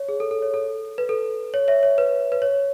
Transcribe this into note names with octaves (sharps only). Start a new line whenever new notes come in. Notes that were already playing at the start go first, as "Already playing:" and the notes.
Already playing: C#5
G#4
A4
A4
C#5
A4
B4
A4
C#5
C#5 E5
C#5
B4
B4
C#5